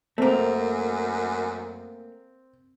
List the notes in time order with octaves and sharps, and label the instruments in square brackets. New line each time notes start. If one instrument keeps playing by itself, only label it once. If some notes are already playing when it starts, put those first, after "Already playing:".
[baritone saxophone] F#2 [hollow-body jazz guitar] A3 A#3 [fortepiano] C4